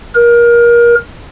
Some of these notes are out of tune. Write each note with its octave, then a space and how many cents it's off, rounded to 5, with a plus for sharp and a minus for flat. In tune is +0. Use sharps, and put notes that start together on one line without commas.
A#4 +25